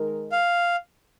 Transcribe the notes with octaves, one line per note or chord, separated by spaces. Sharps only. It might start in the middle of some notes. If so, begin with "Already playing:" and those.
Already playing: D#3 G#3 D#4 A#4
F5